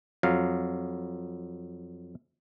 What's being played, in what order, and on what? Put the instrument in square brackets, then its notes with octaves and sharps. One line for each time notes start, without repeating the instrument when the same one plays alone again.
[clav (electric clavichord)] F2 F#3 F5